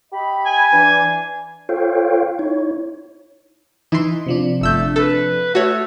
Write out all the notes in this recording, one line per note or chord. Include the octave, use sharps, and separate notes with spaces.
G4 D#5 B5
G#5
E3 D4
F4 A4 C5 C#5 F5 G5
D#4 E4 C#5
E3 D#4 C6
C3 F3 D4
G1 A3 E6 G6
A4 B4
A3 F#4 C#5